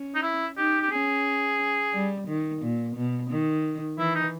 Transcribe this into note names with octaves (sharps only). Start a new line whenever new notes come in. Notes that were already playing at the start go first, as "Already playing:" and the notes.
Already playing: C#4
D#4
E4
D#4 G4
G4
C#4 G#4
G3
D#3
A#2
B2
D#3
E3 E4
D#4